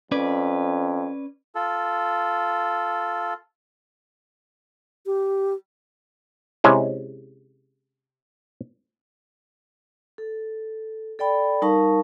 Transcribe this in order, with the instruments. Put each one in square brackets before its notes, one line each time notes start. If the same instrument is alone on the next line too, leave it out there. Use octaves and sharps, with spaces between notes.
[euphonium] F2 [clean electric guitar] C#4 B4 D5
[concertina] F4 A4
[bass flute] G4
[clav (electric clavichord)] C3 G#3 C#4 E4
[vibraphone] A4
A4 D5 G5 B5
G3 D#4 A#4 F5 A5 C#6